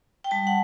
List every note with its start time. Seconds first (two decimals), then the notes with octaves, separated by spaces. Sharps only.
0.24 G5
0.31 G3 A5
0.47 F#5